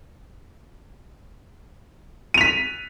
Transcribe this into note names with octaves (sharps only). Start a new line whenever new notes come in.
B6 D#7 F7